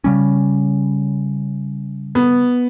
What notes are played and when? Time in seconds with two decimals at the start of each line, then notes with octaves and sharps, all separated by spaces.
0.04 C#3 G3 C#4
2.15 B3